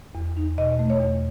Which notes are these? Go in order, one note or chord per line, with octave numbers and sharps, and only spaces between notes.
E2
D#4
B2 D#5
A3
C#5
E2